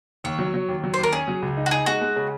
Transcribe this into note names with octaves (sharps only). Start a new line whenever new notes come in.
D#2 C#5
F#3
F#3
D#2
F#3
C5
D#2
A#4
C#4 G#4
F#3
C#2
D#4
F#4
D#4 G#4
G#3 F#4
G#3
C#3